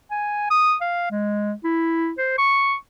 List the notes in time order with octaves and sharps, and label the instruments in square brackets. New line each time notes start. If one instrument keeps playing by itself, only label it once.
[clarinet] G#5
D#6
F5
G#3
E4
C5
C#6